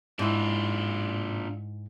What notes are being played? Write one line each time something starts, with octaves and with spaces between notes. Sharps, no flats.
G#2 D4 E4 F4